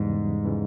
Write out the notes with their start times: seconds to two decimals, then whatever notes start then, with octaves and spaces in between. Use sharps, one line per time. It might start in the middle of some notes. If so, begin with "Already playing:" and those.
Already playing: E2 G#2 C#3 E3 G3
0.45 C#3 E3 G3